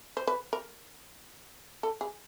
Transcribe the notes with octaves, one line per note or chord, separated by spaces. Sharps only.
C5
B4
A#4
A4
G#4